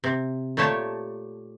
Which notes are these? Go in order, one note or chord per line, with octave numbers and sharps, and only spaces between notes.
C3
A#2 A3 G4 C#5 A5